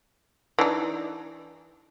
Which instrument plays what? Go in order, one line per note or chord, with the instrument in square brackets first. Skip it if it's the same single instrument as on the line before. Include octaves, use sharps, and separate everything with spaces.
[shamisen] E3 D4 D#4